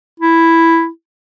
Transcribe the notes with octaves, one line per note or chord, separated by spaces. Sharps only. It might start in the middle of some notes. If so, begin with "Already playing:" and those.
E4